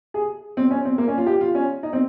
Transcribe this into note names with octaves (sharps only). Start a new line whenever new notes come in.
G#4
C4
C#4
C4
A#3
C#4
F4
G4
F4
C#4
D#4
C4